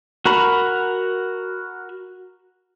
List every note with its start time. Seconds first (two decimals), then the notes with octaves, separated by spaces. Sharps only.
0.26 F#4 A#4 A#5 B5